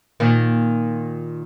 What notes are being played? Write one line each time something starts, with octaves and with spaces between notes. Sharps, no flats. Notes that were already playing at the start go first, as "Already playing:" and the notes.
A#2 D#3